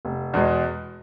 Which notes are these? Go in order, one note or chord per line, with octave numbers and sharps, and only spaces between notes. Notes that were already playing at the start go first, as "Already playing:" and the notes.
F1
E2 B2 G#3